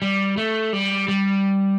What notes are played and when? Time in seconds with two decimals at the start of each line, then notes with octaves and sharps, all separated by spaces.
0.02 G3
0.37 A3
0.73 G3
1.08 G3